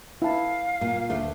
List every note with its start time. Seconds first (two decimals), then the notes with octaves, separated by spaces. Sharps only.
0.22 E4 F5 A5
0.81 A#2
1.10 D2 A3 D4